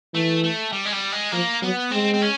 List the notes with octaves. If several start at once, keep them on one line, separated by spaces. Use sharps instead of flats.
E3 A3
A3
G3
G#3
G3
G#3
F3 A#3
F#3 B3
G#3 C4
C4
C#4